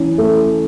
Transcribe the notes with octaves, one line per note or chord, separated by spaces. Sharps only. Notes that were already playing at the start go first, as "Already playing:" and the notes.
Already playing: E3 C#4
A3